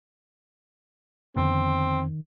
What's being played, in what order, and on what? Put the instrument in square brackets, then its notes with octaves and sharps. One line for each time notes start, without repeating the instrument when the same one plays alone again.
[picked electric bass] F2 D3 B3 [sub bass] D#3 [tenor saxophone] C4